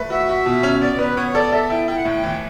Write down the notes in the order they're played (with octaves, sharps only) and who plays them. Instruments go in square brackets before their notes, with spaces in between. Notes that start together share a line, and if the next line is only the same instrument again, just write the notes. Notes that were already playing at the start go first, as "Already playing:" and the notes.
Already playing: [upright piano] A3 B4
[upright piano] F#4 [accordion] E5
[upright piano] F#4
B2
C#4
[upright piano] B3 [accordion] D5
[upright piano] B3 [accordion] B4
[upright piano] B3 [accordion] C#5
[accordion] C#5
[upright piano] A4 [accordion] D5
[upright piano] A4 [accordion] E5
[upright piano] E4 [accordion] G5
[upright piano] E4 [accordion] G5
[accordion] F#5
[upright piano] A2 [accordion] G5
[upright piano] E3